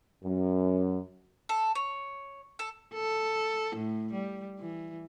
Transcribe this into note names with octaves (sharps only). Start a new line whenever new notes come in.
F#2
A4
C#5
A4
A4
A2
G3
E3